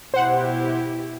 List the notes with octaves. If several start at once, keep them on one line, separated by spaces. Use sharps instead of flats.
B2 E4 G4 C5 F#5